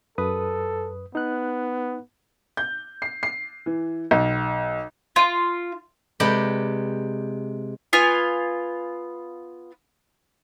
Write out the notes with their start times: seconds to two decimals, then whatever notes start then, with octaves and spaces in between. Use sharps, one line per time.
0.18 F#2 A4 B4 D#6
1.15 B3 D#4 F#6
2.57 G6
3.02 C7
3.23 C7
3.66 E3
4.11 B1
5.16 F4 C6 D#7
6.20 C3 G#3 B4 D5 G5 B5
7.93 B3 F4 F5 G#5